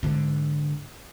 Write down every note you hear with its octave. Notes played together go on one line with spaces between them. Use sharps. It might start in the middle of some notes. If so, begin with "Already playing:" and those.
G#2 D3